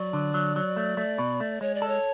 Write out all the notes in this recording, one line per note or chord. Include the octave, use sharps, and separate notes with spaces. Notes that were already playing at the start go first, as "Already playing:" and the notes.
Already playing: F#3 D5
D3
F#3
F#3
A3
A3
B2
A3
G#3 C#5
D5
A4
C#5